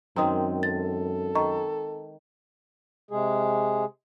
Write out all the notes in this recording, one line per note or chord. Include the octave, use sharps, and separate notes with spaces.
F#2 D#3 G#3 C4 A#5 D#6
A4 A6
D#3 D#5 A#5 C#6
C3 G#3 G#4